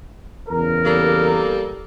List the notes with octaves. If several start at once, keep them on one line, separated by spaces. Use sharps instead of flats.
E2 C#3 A#4
G3 A#3 A4